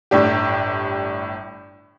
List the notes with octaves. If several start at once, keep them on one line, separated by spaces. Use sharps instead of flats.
G1 A2 D4 G4